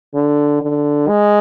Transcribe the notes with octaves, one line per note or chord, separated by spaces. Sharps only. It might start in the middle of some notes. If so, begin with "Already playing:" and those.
D3
D3
G#3